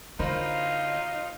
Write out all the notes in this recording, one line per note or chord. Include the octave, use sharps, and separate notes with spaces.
D3 D#4 F4 A#4 C5 B5